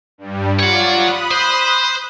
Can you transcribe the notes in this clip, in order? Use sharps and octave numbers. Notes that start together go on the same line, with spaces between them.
G2 G3
F4 C#5 D5 F#5
B5 D#6 F#6
C5